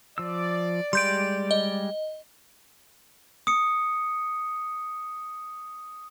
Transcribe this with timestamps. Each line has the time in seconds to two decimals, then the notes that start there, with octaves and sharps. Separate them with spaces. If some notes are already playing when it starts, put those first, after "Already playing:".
0.18 F3 D5 E6
0.93 G3 G#3 G4 C6 G6 D7
1.51 D#5
3.47 D#6 C#7